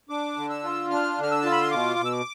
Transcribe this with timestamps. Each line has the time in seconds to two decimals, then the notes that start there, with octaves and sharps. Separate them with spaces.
0.09 D4 D6
0.36 D3
0.50 E6
0.63 F4
0.91 D4 F6
1.18 D3
1.23 F6
1.31 E6
1.42 F4 A5
1.52 B5
1.61 C6
1.72 B2 D6
1.99 B2
2.05 E6
2.12 D6